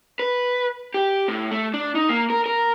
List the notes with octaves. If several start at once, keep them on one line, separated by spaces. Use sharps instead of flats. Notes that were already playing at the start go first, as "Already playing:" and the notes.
B4
G4
A2
A3
D4
D#4
A#3
A#4
A#4